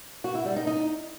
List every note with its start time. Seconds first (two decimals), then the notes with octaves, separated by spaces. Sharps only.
0.24 F#4
0.35 E4
0.46 G3
0.56 D#4
0.67 D#4